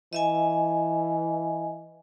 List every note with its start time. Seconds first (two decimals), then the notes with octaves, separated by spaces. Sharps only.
0.13 E3 D#5 E5 G#5